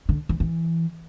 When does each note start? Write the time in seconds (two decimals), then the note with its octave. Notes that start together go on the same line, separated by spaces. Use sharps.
0.09 D3
0.29 E3
0.40 E3